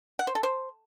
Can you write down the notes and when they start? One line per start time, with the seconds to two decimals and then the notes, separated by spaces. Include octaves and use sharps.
0.19 F#5
0.27 C5
0.35 A4
0.43 C5